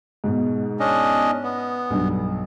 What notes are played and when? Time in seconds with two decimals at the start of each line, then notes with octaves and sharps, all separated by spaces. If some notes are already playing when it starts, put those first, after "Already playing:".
0.24 G#2 B2
0.80 C#4 D4 D#5
1.43 B3
1.90 B1 G2